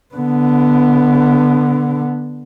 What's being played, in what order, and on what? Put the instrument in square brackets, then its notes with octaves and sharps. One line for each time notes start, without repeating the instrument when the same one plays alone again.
[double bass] D3 B3